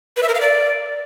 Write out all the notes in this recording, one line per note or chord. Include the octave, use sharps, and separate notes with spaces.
B4
E5
A#4
F5
D5